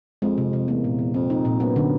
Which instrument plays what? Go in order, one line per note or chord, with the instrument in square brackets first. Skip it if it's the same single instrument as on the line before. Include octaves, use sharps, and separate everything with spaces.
[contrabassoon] F2 [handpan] G#3
[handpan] C3
C3
[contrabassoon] E2 [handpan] A#3
[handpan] A#2
A#2
[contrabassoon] F2 [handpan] C4
[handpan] D#4
A#2
[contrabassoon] F#2 [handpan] B3
[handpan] D3